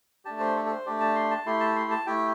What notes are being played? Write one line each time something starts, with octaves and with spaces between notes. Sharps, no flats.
A3 D4 G4 A5
C5
A4
A4
C5
A3 D4 G4 D5
A5
C6
A5
A3 E4 G4 C6
A5
C6
A5
A3 E4 G4 G5